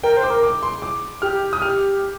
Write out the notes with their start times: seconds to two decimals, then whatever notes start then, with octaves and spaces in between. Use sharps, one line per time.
0.03 A#4 G5
0.17 C5
0.23 D6
0.30 A#4
0.43 D6
0.63 C6
0.82 D6
1.22 G4 F6
1.53 D#6
1.62 F6